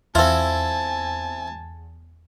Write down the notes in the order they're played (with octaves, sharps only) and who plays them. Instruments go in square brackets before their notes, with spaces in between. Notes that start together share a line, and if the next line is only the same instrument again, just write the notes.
[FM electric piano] E2 [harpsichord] C4 E4 [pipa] F4 A4 [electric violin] G#5 A5